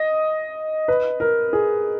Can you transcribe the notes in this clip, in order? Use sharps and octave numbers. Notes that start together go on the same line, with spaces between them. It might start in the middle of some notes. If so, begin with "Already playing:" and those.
Already playing: D#5
B4
A#4
G#4